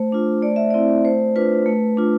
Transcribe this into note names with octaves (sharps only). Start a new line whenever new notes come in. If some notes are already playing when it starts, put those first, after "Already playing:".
Already playing: A3 C5
D4 F4
A3 D5
E5
C4 E4 D5
A3 C5
D4 F4 B4
A3
D4 F4